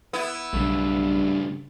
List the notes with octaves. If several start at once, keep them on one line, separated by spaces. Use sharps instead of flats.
B3 E4
B1 G2 C#3 A3